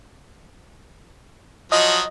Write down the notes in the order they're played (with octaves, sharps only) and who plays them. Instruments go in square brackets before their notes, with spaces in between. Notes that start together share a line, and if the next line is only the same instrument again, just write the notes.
[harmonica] F3 F#3 F#5 [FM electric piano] D#5